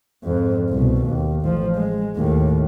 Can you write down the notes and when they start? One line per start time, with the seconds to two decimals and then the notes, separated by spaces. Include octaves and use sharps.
0.24 F2 G#2
0.70 C2 B2
1.03 D#2
1.42 A1 F3
1.76 G#3
2.16 D#2 A2